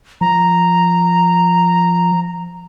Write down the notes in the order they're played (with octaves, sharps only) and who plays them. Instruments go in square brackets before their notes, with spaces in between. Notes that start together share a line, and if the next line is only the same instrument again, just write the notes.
[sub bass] F3 [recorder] A#5